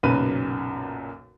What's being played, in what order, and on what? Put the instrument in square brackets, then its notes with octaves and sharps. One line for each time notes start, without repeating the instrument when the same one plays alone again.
[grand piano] B1 F#2 A#2 C#3 B4 D#7